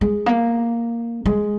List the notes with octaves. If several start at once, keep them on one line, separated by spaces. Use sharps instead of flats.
G#3
A#3
G#3